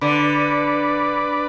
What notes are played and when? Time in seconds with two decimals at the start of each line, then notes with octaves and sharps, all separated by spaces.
0.01 D3 B4 D5